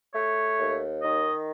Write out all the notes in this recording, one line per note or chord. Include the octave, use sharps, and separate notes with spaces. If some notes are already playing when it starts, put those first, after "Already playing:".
A3 C#5
D#2
D#3 D#5